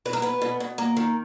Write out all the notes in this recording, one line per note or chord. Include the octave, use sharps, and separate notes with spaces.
B2 B4
A#4
B3 B4
B2
B2
A#3
D#3